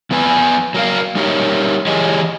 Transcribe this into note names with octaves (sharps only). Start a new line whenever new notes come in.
F3 B3 B4 G#5
F#3 A#4 F5
G3 D#4 G4 A#4 C5 C#5
E3 G4 G#4 C#5 D#5